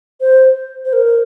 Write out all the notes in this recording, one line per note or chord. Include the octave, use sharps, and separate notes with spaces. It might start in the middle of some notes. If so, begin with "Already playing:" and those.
C5
C5
A#4